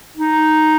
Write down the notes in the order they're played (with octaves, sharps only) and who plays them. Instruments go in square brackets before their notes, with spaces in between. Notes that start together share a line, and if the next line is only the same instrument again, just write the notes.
[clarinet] D#4